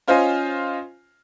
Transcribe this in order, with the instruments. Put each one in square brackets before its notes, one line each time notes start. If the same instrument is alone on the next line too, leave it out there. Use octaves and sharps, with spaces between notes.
[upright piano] C#4 F4 C5 D#5 F5 G#5